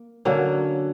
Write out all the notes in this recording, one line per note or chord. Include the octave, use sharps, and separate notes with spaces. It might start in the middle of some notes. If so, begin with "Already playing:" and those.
Already playing: A#3
D3 F#3 A#3 C#4